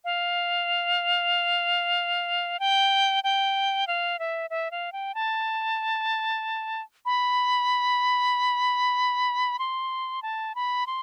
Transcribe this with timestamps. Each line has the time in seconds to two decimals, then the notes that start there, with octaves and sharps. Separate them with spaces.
0.05 F5
2.60 G5
3.24 G5
3.87 F5
4.19 E5
4.50 E5
4.71 F5
4.92 G5
5.15 A5
7.06 B5
9.59 C6
10.23 A5
10.55 B5
10.87 C6